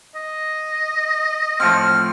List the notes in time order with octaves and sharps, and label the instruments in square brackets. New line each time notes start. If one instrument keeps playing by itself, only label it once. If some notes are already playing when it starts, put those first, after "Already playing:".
[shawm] D#5
[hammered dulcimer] A2 F3 C4 [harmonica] F6